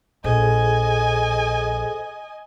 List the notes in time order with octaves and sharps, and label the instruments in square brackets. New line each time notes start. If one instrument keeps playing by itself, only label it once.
[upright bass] A#1 [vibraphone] G#4 A4 C5 [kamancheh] D#5 G#5